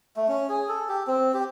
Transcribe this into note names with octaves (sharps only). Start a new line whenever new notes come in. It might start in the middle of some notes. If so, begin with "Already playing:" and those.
A3
C#4
G#4
A4
G4
C4
G4